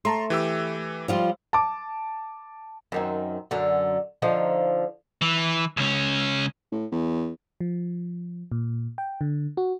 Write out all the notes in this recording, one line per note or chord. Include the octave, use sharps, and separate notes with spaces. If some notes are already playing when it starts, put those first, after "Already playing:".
A3 A5 A#5 C6
E3 G4 E6
F3 G3 F4
A5 D6
F#2 D#3 C4
F#2 D3
D3 F3 D#4
E3
C#2 C#4
A2
E2
F3
A#2
G5
D3
F#4